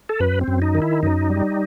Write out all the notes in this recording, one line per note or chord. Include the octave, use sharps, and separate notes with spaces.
A4
F#2 B4
C4
F#2
D#4
D#3
E4
F#2 D#4
G3